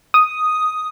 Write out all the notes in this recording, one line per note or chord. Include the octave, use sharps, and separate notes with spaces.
D#6